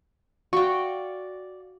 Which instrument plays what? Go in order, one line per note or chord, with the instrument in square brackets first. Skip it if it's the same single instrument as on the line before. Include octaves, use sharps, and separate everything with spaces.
[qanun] F#4 G5 [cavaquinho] D5 F5 C#6